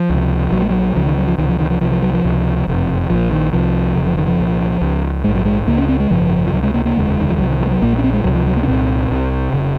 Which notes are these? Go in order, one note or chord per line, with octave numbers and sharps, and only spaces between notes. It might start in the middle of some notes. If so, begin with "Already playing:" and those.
Already playing: F3
C#2 C3
A#1 A#2 F#3
G#3
F#3
C#2 C#3 F3
D#3
F#3
F3
C#2 C3 D#3
F3
D#3
F3
C2 C3 F3
F3
F#3
F3
C#2 C3
F#1 F2 C3
A#1 A#2 F3
D#3
C2 C3 F3
F1 F2 C#3
F3
D#3
F3
C2 A#2
C#2 C#3
A#1 G#2 G#3
F#3
G#3
C#2 C#3 A#3
C#4
C4
G#3
G#1 F#2 C#3 F3
F3
C#2 C3 F#3
G#3
A#3
A#3
F1 D#2 C#3 G#3
D#3
F3
C2 C3 F#3
D#3
F3
G#3
F#3
A#1 A#2 A#3
G#3
C#4
C4
G#3
C#2 C3 F#3
F3
F#3
A#3
C#4
C2 A#2 C4
C2 C3
F1 C#3